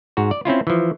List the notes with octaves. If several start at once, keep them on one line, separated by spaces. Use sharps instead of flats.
G#2 F#4
D5
C4 C#4 E4 F4
E3 F3